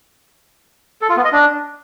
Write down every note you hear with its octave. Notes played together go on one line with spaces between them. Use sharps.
A4
F4
B3
D#5
D4